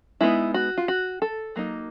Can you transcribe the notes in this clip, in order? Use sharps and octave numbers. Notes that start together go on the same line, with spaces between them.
G#3 B3 D#4 E4
F#4
F4
F#4
A4
F#3 A#3 D#4